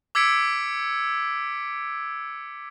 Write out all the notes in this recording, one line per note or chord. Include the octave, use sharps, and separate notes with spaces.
D6 E6 G#6 B6 C#7 D7